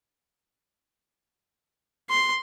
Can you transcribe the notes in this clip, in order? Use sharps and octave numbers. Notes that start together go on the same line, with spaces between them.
C6